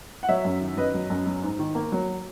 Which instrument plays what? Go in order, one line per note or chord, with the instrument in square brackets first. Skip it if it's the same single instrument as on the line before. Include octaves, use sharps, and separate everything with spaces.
[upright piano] F#5
F#3 C#5 E5
F#2
D#3
F#2 B4 D#5
F#3
F#2
F#3
G#2
D#3
A#3
F#3